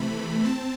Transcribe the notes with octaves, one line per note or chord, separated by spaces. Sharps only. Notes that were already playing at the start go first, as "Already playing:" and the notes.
Already playing: C3 E3 A3 B5
C4 A5